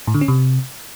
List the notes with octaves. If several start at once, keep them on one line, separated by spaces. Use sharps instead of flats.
A2
D3
C#4
C3